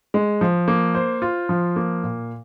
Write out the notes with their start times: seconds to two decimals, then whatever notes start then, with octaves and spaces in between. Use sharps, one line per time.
0.14 G#3
0.41 F3
0.68 A#3
0.95 C5
1.22 F4
1.49 F3
1.76 A#3
2.03 A#2